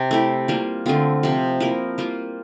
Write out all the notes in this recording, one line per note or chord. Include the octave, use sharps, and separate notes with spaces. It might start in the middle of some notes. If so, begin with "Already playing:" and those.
Already playing: C3 C4
A3 E4 G4
G3 A#3 F4
D3 A3 C4 F4
C3 F3 C4
F3 A#3 E4 A#4
G3 A#3 F4